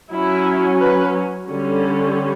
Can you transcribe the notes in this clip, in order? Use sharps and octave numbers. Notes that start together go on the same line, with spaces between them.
F#3 C#4 E4
B4
D3 G3 C#4